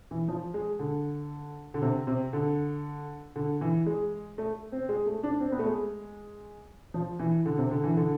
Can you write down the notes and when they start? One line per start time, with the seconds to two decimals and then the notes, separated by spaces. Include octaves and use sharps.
0.11 E3
0.28 F3
0.54 G#3
0.79 D3
1.74 D3
1.82 C3
2.07 C3
2.33 D3
3.36 D3
3.61 E3
3.86 G#3
4.38 A3
4.72 C4
4.89 G#3
5.06 A3
5.23 D4
5.40 C4
5.52 B3
5.59 A3
5.66 G#3
6.94 F3
7.20 E3
7.46 D3
7.58 C3
7.71 D3
7.84 E3
7.97 D3